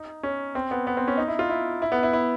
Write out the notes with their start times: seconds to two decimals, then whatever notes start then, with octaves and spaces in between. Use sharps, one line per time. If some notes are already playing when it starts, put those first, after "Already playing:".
Already playing: D#4
0.23 C#4
0.55 C4
0.71 B3
0.87 B3
0.97 C4
1.08 C#4
1.17 D#4
1.28 E4
1.39 F4
1.50 E4
1.82 E4
1.92 B3
2.03 E4
2.13 E4